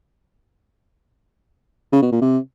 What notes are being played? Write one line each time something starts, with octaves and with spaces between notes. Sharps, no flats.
C#3
B2
A#2
C3